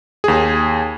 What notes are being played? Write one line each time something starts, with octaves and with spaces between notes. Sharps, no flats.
D#2 G#4